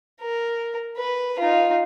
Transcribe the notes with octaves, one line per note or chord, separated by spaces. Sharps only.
A#4
B4
D#4 F4